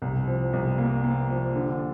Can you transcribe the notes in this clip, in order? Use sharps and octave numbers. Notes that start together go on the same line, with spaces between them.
C2
F3
C2
A#3
A#3
F3
D3